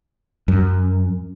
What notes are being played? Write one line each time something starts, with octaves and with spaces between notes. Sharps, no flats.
F#2